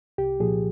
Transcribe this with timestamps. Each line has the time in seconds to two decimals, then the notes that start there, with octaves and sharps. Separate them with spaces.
0.18 C2 G4
0.40 A#2 F3 G#4